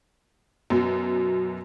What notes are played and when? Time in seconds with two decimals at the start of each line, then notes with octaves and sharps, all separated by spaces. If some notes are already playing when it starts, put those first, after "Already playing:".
0.70 F#2 B2 F#3